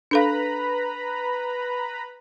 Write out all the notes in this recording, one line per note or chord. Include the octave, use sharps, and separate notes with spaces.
D4 A4 B4 F5 A#5 B5